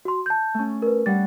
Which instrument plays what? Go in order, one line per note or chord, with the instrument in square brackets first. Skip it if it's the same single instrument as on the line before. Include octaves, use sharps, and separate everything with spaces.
[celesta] F#4 C6
A5 G6
[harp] A3 C#4
[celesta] A#4 B4
[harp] G3 C#4 F#5 [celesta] A6